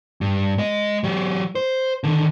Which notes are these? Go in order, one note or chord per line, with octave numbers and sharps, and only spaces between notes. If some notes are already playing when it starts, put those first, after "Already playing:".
G2
G#3 D#5
F#3 G4
C5
D3 D#3